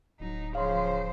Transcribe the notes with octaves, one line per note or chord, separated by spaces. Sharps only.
D1 F#3 D#4
C#3 F3 C5 F5 C6